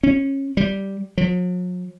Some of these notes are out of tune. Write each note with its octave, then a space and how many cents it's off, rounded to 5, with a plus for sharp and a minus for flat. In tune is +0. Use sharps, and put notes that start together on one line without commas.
C#4 -20
G3 -5
F#3 -45